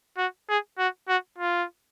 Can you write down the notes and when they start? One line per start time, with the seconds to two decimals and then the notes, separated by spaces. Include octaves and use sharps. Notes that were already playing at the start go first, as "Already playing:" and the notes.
0.18 F#4
0.49 G#4
0.79 F#4
1.08 F#4
1.38 F4